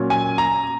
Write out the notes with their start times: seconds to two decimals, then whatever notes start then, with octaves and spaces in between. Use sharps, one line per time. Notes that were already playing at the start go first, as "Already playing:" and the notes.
Already playing: A#2 F#3 C#4
0.10 G#5
0.38 A#5